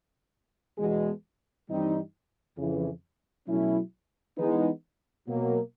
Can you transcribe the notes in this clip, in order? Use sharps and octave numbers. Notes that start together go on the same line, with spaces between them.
E2 B2 G#3
G2 E3 G3 C4 D#4
F2 C#3 E3
B2 F#3 A3 C#4 E4
E3 G#3 B3 D#4
B2 F#3 A#3